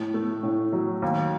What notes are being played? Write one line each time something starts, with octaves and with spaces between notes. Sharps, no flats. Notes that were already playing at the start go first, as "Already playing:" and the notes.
Already playing: A2
A3
A2
F#3
D#2